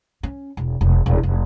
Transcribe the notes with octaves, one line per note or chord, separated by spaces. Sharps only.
C#4
E1
E1
D#1
F1